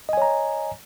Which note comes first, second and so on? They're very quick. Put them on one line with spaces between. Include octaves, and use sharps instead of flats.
D#5 G#5 C#5 A#5